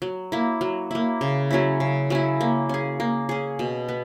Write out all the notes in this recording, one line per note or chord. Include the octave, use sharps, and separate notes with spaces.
F#3
A#3 E4
F#3
A#3 E4
C#3
F#3 C#4 E4
C#3
F#3 C#4 E4
A#3
C#4 G#4
A#3
C#4 G#4
B2
B3